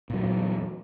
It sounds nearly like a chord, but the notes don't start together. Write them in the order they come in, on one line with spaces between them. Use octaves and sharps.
A#2 F#3 E2